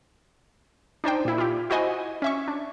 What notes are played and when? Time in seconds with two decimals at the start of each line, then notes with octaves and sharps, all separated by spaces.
1.04 D4 D#4 C5 G5
1.25 A#2 E4
1.38 F4 G4
1.70 E4 F#4 C5 D#5 G#5
2.22 C#4 E5 C#6
2.48 D4